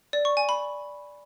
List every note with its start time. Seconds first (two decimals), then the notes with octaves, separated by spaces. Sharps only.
0.13 D5
0.25 C#6
0.37 G#5
0.49 B5